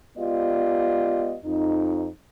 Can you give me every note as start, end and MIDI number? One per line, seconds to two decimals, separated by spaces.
0.18 1.36 56
0.18 1.36 59
0.18 1.36 65
0.18 1.36 67
0.18 1.36 74
0.18 1.36 75
1.45 2.06 41
1.45 2.06 63